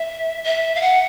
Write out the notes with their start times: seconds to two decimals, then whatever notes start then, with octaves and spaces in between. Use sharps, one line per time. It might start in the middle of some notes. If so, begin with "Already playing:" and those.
Already playing: E5
0.44 E5
0.76 F5
0.81 F#5